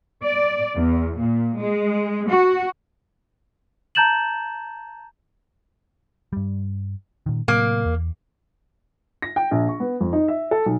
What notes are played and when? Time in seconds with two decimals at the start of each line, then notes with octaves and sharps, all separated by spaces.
0.22 D5
0.76 E2
1.19 A#2
1.59 G#3
2.30 F#4
3.95 A5 A#5 G6 A6 E7 F#7
6.33 G2 G3
7.26 A#2 D#3
7.48 A2 C3 F#3 A#3
7.86 E2
9.22 A#6
9.36 G5
9.51 A#1
9.68 C#6
9.80 B3
10.01 F2
10.13 D#4
10.28 E5
10.51 A4
10.66 B1